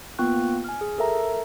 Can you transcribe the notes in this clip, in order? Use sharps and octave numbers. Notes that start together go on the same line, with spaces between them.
A#3 B3 F4 G5 C#6 F#6
G#5 F6
G#4
A4 A#4 E5 A#5